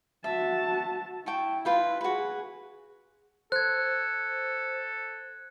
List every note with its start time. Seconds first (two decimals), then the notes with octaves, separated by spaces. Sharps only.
0.24 F#4 E5 A5
1.26 E4 G5 A5 C#6
1.65 F4 B4 G5
2.01 F#4 G#4 B4
3.52 A4 C5 F#6 G#6